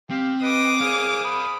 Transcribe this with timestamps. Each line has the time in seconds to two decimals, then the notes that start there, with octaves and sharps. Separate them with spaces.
0.10 C4 G4 F5
0.42 B4 D#5 D6 D#6
0.80 G#4 C5 D5 F5
1.24 B5 D#6